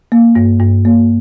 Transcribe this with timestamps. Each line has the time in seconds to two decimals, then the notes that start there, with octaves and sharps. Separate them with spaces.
0.12 A#3
0.35 G2
0.60 G2
0.85 A#3